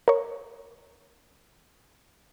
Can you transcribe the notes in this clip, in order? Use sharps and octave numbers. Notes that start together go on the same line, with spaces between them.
A#4 C#5